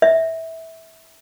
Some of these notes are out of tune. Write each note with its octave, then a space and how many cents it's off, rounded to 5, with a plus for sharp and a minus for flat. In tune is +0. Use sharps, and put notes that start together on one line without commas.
E5 -20